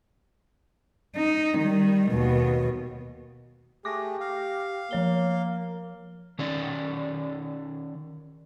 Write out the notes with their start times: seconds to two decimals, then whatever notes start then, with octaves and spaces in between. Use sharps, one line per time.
1.16 D#4
1.58 D#3 G3
2.10 D#2 B2
3.85 A3 G4 G#4 D6 A#6
4.20 F5
4.91 F3 A#3 C#5 G7
6.39 D#3 C#4 D5